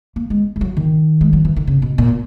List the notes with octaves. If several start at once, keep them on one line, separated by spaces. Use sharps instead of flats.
A#3
G#3
G#3
F#3
D#3
G#3
F#3
E3
D#3
C#3
B2
A#2